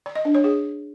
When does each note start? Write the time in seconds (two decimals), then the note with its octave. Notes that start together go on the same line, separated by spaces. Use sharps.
0.06 D5
0.15 D#5
0.25 D4
0.35 C#5
0.44 G#4